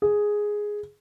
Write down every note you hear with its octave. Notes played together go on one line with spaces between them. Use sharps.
G#4